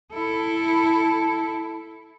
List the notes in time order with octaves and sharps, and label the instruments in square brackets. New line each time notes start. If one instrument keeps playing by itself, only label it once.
[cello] E4 A4